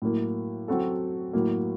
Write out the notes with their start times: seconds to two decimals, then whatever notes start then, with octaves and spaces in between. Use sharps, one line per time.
0.02 A2 F#3 A#3
0.68 F#3 C4 F#4 A4
1.33 A2 F#3 A#3